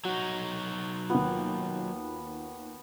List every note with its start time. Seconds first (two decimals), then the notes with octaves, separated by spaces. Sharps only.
0.05 F#3 D#4 F#4
1.10 D#2 B3 F4